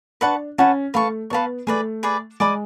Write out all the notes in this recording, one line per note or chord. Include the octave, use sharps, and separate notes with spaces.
D4 B4 F#5 A5 C#6
C#4 B4 F#5 A5 C#6
A3 B4 F5 A5 C#6
B3 B4 F5 A5 C#6
A3 G#4 B4 D5
G#4 B4 D5
G#3 D5 G#5 B5 D6